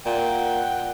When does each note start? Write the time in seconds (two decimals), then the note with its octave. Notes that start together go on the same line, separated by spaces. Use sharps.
0.06 A#2 F#5 G5